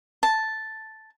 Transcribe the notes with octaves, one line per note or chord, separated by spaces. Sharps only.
A5